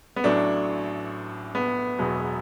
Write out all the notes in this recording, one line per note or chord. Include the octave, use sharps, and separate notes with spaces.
B3
A1 A2 F#3 D4
B3
E1 E2 B2 F#3